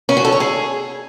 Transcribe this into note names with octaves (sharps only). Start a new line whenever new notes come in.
C#4
F#4
A4
C#5
G#4